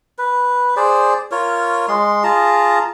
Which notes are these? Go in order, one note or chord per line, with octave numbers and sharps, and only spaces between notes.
B4
G#4 C5 D5
F4 A#4 C#5
G#3 C6
F4 G#4 A5 A#5